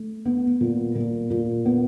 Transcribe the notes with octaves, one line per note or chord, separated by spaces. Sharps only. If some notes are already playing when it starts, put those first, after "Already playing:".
Already playing: A3
B3
A#2
A#2
A#2
B3